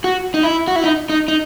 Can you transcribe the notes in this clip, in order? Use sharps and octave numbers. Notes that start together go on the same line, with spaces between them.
F#4
D#4
E4
F#4
E4
D#4
D#4
D#4